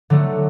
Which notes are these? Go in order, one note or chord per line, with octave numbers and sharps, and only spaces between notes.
D3 F#3 A3